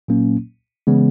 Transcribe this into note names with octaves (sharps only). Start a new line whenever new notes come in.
A#2 F#3 A#3 C#4
C#3 E3 G#3 B3